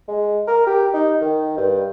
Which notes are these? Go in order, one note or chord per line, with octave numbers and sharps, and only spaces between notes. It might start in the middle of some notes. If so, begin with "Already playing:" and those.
G#3
A#4
G4
D#4
D#3
G2